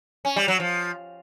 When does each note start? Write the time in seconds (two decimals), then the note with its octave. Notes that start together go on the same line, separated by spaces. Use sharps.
0.25 C#4
0.36 G3
0.48 F#3
0.60 F3